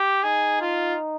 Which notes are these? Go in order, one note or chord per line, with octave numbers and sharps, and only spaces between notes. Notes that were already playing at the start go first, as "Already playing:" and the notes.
Already playing: G4
D#4 G#4
F4